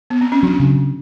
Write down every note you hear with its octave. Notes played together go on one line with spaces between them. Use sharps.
B3
C4
C#4
F#3 D4
C#3